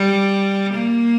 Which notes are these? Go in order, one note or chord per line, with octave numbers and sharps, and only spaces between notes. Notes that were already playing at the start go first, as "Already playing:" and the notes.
Already playing: G3
A#3